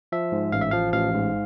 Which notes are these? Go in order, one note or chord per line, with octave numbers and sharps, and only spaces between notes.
F3 E5
G#2
A1 F5
E5
F3 F5
A1 F5
G#2